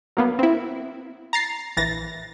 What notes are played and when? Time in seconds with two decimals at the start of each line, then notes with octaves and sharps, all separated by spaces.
0.17 F#3 A#3 B3
0.39 C4 E4
1.33 A#5 A6 C7
1.77 A#1 E3 A6 A#6